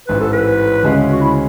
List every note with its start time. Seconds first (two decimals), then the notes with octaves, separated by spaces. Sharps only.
0.08 A1 G#2 E3 B4
0.20 A4
0.33 B4
0.83 D2 C#3 G#3 C#4
1.12 F#4
1.21 E4